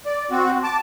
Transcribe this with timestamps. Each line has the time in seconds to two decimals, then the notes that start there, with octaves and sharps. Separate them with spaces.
0.06 D5
0.31 C4 F#4
0.63 A5 D6